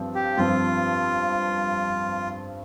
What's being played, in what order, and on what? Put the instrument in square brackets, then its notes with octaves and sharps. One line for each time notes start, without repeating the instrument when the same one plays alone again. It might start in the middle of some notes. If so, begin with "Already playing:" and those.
Already playing: [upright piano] G2 F3 C4
[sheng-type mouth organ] G4
[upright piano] G2 F3 C4 [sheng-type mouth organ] F4